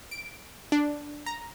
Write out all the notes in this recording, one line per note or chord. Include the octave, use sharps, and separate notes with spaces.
D7
D4
A#5